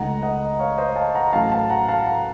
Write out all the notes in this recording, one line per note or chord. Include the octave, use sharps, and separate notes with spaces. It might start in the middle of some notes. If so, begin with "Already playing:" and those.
Already playing: C#2 C#3 A3 D#4 F#5 A#5
D#5 F#5
C#5 F5
C5 D#5
F5 A5
F#5 A#5
A#5
A1 A2 F#3 A3 C#4 F5 A5
F5 A5
F#5 A#5
F5 A5
F#5 A#5